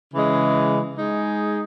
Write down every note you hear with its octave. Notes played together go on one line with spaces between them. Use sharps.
C#3 E3 G#3
G#3 D#4 G#4